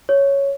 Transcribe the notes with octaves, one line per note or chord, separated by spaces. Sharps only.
C#5